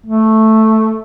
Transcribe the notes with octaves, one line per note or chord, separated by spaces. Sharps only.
A3